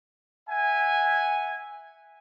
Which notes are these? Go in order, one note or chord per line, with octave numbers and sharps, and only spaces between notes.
E5 F#5 G#5